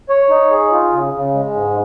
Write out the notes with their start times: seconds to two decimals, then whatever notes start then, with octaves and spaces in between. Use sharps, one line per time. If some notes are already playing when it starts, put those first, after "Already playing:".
0.09 C#5
0.30 D#4
0.51 G#4
0.72 F4
0.92 C#3
1.14 C#3
1.34 G#3
1.55 G#2